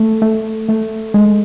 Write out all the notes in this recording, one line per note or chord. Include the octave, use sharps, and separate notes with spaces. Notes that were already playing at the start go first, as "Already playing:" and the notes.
Already playing: A3
A3
A3
G#3